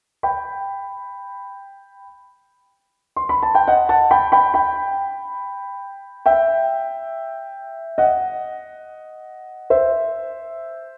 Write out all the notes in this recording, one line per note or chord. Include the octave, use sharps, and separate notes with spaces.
G5 B5
C6
B5
A5
G5
D#5 F#5
F#5 A5
G5 B5
G5 B5
G5 B5
E5 G5
D#5 F#5
C5 E5